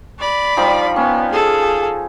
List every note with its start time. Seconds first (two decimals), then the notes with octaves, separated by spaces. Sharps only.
0.19 D5 B5
0.57 F3 G3 D#4
0.96 B3 C#4
1.32 G#4 A4